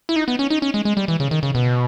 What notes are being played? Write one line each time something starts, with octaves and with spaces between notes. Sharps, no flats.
E4
D#4
B3
C#4
D#4
C#4
G#3
G#3
G3
E3
C#3
D#3
C#3
B2